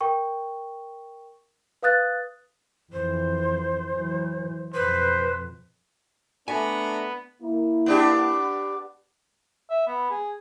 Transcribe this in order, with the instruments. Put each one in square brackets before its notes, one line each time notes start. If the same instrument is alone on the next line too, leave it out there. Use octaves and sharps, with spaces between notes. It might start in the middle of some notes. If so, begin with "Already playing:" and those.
[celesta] A#4 G5 C#6
B4 F5 D#6 F#6 A6
[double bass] F2 E3 [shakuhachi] C5
[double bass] E3 F#3
[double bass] F2 B2 [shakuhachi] B4 [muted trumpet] C5
[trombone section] A3 D4 [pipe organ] B3 [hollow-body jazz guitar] G#5 [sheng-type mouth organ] A#5 B5 C#6
[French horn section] A#3 E4
[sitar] B3 D4 G4
[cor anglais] E5
B3
G#4